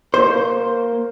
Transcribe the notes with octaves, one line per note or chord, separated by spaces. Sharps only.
A#3 C5